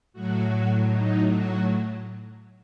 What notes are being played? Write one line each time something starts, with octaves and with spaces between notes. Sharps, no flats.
A2 F#3 F#4
D#4
F#4